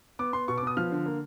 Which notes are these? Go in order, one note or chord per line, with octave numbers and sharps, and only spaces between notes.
B3 D6
B3 C6
B2 C#6
D6
B3 D#6
F3 F6
D3
A#3